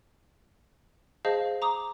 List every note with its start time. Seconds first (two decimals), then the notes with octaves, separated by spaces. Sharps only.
1.25 G#4 C5 D#5 F5 A5
1.62 A#5 D6 D#6